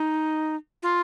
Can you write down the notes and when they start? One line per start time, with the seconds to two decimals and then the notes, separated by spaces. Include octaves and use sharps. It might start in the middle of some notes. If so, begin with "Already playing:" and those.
Already playing: D#4
0.83 F4